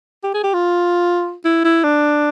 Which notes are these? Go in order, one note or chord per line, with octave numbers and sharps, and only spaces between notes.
G4
G#4
G4
F4
E4
E4
D4